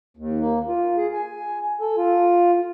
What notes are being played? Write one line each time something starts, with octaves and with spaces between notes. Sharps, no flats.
D#2
A#3
F4
G#4
G#5
A4
F4